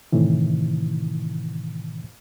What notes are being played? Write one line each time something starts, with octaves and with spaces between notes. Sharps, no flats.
A2 C3 D#3 E3